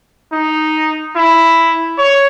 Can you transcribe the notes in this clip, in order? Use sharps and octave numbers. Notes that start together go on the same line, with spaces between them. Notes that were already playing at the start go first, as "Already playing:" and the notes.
D#4
E4
C#5